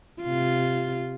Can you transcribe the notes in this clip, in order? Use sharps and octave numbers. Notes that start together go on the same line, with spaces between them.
C3 F4